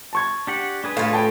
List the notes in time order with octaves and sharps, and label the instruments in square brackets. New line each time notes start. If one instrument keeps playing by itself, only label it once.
[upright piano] A5 C#6 G#6
[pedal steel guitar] D4 G4 F#5
D4 G#4 B4
[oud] A2 F4 [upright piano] F5
[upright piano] A4 G5 A5